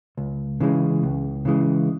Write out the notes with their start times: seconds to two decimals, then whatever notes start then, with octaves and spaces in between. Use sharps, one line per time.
0.17 C#2
0.60 C#3 E3 G#3
1.03 C#2
1.45 C#3 E3 G#3